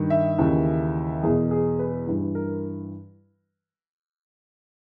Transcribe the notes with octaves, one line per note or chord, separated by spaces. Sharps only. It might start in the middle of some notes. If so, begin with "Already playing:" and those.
Already playing: G2 D#3
E5
D#2 C#3 E3
E2 B2 G#4
G#4
B4
G2 E3
A#4